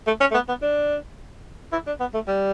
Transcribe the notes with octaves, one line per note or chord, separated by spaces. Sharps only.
A3
C#4
A3
B3
B3
D4
E4
D4
B3
A3
G3